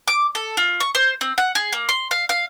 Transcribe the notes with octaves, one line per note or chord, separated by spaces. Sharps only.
D6
A4
F4
C#6
C5
C4
F#5
G#4
A#3
C6
F5
F5